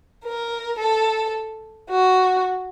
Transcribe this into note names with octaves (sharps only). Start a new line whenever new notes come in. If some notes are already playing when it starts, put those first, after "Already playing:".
A#4
A4
F#4